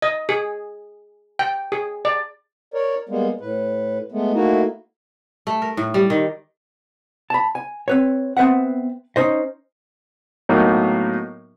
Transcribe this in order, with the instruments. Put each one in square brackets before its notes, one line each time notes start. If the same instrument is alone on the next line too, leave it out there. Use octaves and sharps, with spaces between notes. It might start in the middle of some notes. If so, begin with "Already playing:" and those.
[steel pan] D#5
G#4
G5
G#4
D5
[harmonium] A#4 C#5 D5
G3 G#3 A#3 B3
A2 B4
G#3 A3 B3
A3 A#3 D#4 E4 F#4
[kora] A3
A#4
A2
G3
D#3
[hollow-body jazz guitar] A5 B5
G#5
C4 B4 C#5
B3 C4 B4 E5 F#5
C#4 D#4 C5 D#5
[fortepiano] A2 F#3 A#3 B3 D#4